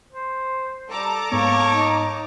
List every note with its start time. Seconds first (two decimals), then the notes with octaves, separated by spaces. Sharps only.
0.12 C5
0.90 G3 A4 A5 A#5 D6
1.32 G#2 A#3 B3 A4 C#5
1.69 D#4